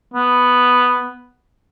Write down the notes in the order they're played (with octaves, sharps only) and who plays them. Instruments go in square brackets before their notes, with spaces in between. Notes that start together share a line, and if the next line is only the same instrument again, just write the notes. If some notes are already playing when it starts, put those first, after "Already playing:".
[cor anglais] B3